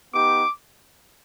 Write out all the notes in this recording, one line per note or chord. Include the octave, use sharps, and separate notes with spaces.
B3 D#4 G4 D6